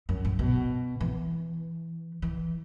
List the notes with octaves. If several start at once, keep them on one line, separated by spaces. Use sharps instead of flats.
F#2
A2
B2
E3
E3